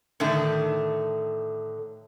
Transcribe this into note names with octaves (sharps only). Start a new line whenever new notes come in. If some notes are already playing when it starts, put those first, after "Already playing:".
A2 D3 D#3 A3